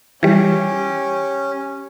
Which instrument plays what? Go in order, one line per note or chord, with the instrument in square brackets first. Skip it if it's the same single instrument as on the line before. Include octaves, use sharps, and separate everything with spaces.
[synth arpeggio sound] E3 G3 [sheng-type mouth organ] C#4 [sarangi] G4